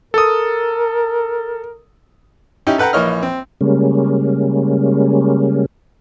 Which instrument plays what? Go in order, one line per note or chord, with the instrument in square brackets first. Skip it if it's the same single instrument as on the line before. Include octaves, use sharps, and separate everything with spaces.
[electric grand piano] A4 D#6 [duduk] A#4
[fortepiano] C#4 D#4 E4 G4
A4 B4 F#5 G5 A#5
A#1 E3 A#3 C#5 D#5 F6
C4
[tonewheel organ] C#3 G3 G#3 A#3 C#4